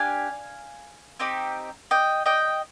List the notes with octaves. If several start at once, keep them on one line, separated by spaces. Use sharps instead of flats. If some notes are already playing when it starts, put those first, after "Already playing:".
Already playing: D4 G4 F5 G#5
C4 D#4 G4
D#5 G5
D#5 G5